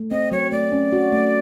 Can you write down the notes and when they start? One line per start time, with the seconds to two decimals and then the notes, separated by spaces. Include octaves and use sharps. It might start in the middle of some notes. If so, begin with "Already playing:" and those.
Already playing: A3
0.11 C4 D#5
0.32 F#3 C#5
0.52 A3 D5
0.72 C#4
0.93 F#4
1.12 A3